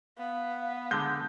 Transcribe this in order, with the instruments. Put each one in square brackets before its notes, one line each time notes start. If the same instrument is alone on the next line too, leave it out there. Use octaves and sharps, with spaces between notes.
[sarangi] B3 [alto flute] F5
[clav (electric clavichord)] D3 G#3 [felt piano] G6